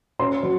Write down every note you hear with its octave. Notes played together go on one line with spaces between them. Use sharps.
C#4 C6
F#3